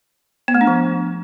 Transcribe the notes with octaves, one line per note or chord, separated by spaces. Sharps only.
B3
A3
D4
F3